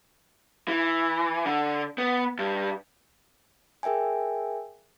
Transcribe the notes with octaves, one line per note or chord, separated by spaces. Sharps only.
E3
D3
B3
G2
G#4 A#4 E5 G5 G#5